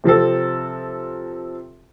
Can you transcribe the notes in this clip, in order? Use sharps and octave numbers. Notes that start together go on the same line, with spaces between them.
C3 F3 C4 A4